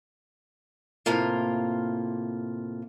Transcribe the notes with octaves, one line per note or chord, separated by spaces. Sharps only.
A2 C3 A#3 F4